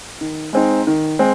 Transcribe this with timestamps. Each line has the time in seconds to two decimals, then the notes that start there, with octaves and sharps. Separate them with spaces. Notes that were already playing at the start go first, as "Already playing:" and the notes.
0.21 D#3
0.53 G#3 C4 D#4
0.87 D#3
1.19 G#3 C4